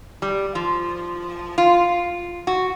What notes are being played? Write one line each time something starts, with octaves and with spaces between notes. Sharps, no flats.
G3
F3
F4
F#4